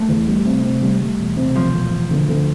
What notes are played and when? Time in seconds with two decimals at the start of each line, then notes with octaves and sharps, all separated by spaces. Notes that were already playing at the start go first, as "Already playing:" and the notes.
Already playing: A3
0.08 E2
0.27 G3
0.45 C3
0.64 C3
0.82 G3
1.00 G3
1.19 E1
1.37 C3
1.55 E1 F3
1.74 E1
1.92 E1
2.10 D2
2.29 D2